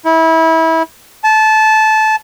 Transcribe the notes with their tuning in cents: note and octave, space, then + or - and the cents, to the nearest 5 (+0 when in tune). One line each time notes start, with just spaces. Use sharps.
E4 -25
A5 -20